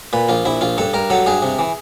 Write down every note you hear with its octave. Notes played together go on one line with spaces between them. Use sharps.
A#2 B4
A#1 F4
A#1 E4
A#1 F4
G2 A4
G2 A#4
F#3 A4
G2 G#4
C3
E3